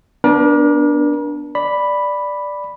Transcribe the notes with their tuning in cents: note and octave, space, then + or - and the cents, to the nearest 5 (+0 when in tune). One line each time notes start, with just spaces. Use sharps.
B3 +0 D4 +0 A#4 +40
D5 +0 B5 +0